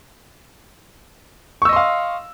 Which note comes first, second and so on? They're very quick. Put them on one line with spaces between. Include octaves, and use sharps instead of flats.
C#6 E6 D#5 C6 F5